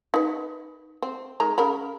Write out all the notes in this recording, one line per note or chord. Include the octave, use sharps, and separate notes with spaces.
D#4 B4
C4
D#3 G#3 A#5
C#3 A#4 B5